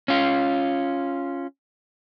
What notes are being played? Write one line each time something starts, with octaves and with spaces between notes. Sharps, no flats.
C#4 F4